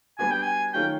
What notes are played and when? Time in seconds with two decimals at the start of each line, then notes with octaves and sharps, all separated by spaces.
0.19 G3 B3 D4 F#4 G#5
0.31 G5
0.43 G#5
0.74 D#3 F#3 A3 C#4 F4 G5